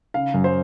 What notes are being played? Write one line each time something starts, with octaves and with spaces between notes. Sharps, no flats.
C#3 F5
F#2
C5